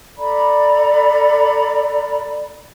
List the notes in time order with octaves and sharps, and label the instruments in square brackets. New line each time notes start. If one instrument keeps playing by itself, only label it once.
[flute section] A4 D5 A#5 B5